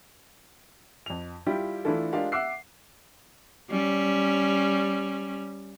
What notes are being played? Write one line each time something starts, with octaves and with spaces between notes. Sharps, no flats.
F2 F7
G3 E4 F4 G4
E3 A3 D4 E4 F4 A4
G#3 D4 F4 G4 A#4 F5
E5 F#5 D6 E6 F#6 C7
G3 C#4